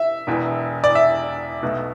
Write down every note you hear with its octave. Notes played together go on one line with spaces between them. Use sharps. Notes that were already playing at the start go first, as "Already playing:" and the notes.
Already playing: E5
E1 E2 E3
D5
E5
B1 B2 A3